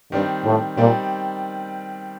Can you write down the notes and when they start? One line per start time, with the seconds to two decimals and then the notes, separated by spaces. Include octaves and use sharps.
0.12 G2 D#3 G3 C4
0.44 A2
0.77 A#2 D#3 G3 C4